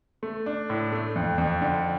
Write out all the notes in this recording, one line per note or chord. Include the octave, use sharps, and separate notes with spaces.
A3
D4
A2
A3
F2
F2
D3